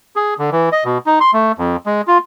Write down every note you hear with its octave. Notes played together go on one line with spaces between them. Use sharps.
G#4
D3
E3
D#5
B2
D#4
C6
A3
F2
G#3
F4